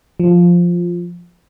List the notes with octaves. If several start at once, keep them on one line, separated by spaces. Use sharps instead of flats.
F3